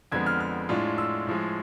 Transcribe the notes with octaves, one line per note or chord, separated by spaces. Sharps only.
F2 D3 G#3 B3 G#6
F6
F6
A2 G#3 D4 F4
E6
A2 F3 G#3